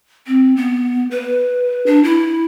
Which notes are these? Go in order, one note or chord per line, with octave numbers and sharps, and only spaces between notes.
C4
B3
B4
D4
E4